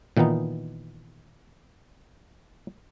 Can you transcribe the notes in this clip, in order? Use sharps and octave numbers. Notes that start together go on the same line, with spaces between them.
A#2 D#3 E3 B3 D#4